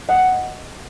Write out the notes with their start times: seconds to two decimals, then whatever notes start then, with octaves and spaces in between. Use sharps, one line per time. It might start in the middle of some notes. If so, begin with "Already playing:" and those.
0.09 D#5 F#5